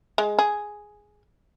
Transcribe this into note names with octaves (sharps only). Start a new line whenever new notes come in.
G#3
G#4